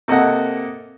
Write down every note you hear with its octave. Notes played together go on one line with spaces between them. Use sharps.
C3 A#3 A4 D#5 F#5